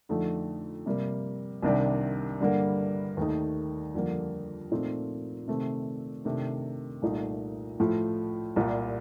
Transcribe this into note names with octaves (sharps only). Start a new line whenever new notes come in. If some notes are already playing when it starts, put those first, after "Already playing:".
F2 D3 A3 D#4
C3 G3 A#3
C2 C3 D#3 G3 D4
G2 D3 G3 A#3
D#2 D#3 A3 D#4
F2 D3 G3 A#3
A#2 A3 C4 D#4
C3 D#3 A3 C4
C3 D#3 A3 D4
C2 A#2 A3 D#4
A2 F3 A3
C2 A#2 G3